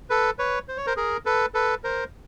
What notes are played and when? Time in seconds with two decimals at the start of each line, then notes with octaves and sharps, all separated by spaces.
0.10 A4 B4
0.38 B4 C#5
0.68 C5
0.77 C#5
0.86 A#4 C5
0.96 G#4 A#4
1.25 A4 B4
1.54 A4 B4
1.84 A#4 C5